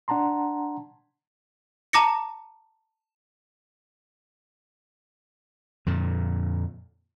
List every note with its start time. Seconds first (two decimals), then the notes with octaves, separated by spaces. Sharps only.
0.08 D4 F#5 A5 A#5 C6
1.93 A5 A#5 D6 A#6 C#7
5.86 F2 A#2 D3